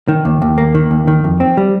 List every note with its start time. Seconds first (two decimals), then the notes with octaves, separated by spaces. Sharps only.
0.08 D#3
0.25 D#2
0.42 D#2
0.58 A#3
0.74 D#3
0.91 D#2
1.08 D#3
1.24 F2
1.40 C4
1.57 G3